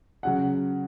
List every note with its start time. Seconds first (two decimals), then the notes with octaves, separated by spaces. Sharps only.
0.23 C#3 F#3 F#5